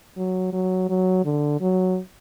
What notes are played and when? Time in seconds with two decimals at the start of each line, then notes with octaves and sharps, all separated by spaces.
0.17 F#3
0.53 F#3
0.89 F#3
1.25 D3
1.61 F#3